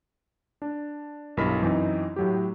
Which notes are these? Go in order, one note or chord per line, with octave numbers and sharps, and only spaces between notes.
D4
B1 G2 E4 A#4 B5 B6
F#2 E3 C4 D#4
A2 F#3 G4